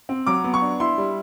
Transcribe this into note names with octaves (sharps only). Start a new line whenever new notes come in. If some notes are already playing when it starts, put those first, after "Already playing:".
C4
F#3 D6
B3
C#6
D4
E4 C6
G3